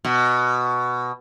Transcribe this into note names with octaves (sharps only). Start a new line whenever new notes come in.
B2